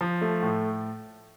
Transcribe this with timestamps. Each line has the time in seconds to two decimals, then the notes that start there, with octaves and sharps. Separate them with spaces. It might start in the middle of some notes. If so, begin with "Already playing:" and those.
0.01 F3
0.21 A3
0.42 A2